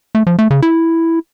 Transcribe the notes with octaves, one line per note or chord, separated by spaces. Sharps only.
A3
F3
A3
C#3
E4